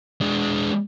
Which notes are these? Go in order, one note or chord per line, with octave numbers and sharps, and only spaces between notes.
G#3 D4